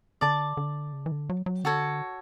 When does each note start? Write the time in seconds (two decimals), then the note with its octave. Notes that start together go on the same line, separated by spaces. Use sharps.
0.21 D3 D5 A5 D6
0.57 D3
0.93 C#3
1.06 E3
1.12 D3
1.29 F#3
1.46 F#3
1.64 D3 F#4 A4 C#5